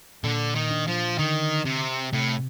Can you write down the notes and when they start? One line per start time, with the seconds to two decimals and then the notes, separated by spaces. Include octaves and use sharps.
0.23 A#2 D3
0.55 D#3
0.71 D4
0.87 F3
1.18 D3 D#3
1.65 C3 C4
2.13 A2 C3